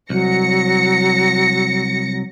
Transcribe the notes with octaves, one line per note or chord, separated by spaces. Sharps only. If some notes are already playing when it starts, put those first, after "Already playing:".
C2 F#3 A#6 C#7